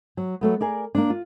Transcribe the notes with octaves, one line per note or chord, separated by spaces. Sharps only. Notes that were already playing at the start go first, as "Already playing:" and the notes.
F#3
F#3 A3 B3
G#4 A#4 D5
A#3 D4
F4